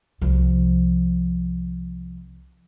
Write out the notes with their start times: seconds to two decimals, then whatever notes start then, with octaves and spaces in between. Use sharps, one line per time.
0.21 C2 F3